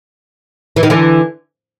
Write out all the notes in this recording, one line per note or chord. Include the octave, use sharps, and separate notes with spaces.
E3
D#3
D3 E3